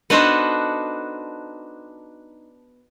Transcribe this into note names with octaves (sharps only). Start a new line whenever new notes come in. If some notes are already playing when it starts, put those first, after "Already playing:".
B3 D4 D#4 F#4 A4 C5